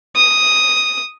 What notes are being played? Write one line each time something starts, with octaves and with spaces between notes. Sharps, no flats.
D#6